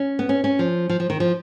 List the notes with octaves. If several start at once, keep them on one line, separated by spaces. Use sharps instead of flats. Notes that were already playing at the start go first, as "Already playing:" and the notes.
Already playing: C#4
B3
C#4
C#4
F3
F3
F3
D#3
F3